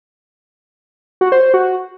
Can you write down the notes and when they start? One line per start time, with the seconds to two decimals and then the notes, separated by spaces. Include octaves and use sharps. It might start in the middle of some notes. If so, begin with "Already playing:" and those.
1.21 F#4
1.32 C5
1.43 C5
1.54 F#4